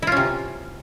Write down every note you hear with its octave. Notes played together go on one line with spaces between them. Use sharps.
C3 C#4 E4 F4